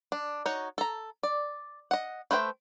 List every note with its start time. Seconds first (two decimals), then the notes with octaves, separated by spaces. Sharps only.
0.12 D4
0.46 D#4 F#4 C#5
0.78 A4 A#5
1.23 D5
1.91 D#5 F#5
2.31 A3 B4 C5 E5 G5